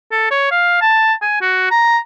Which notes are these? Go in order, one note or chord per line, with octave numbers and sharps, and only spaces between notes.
A4
C#5
F5
A5
G#5
F#4
A#5